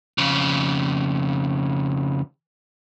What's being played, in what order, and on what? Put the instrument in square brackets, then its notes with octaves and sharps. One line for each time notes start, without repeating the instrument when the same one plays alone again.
[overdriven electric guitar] F2 C#3